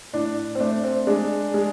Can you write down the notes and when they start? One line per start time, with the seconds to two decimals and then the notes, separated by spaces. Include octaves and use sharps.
0.13 A2 D4
0.55 C4
0.60 A3 D4
0.83 C4
1.07 G#3 D4
1.54 G#3